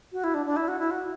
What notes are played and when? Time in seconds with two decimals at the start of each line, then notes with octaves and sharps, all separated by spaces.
0.13 F#4
0.24 E4
0.34 D4
0.46 D4
0.56 E4
0.68 F#4
0.79 E4
0.91 F#4